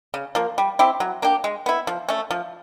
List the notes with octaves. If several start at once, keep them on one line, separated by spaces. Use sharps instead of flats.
C#3
F3 A#3
G3
C4 E4 G4
F#3
A#3 D4 G4
G#3
B3 E4
F3
A3 C#4
F3